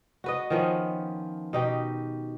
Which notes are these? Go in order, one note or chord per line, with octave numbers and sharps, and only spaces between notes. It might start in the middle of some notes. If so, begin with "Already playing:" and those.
F#4 B4 D#5
D#3 F3 B3 C#4
B2 D#4 G4